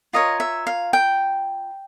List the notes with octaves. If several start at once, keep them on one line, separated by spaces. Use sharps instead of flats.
F4 A#4 C#5 D#5
E5
F5
G5